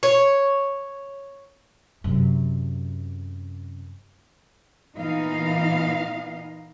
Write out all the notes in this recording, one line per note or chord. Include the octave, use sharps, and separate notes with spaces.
C#5
F#2 C3
A#2 E3 B3 D#4 F5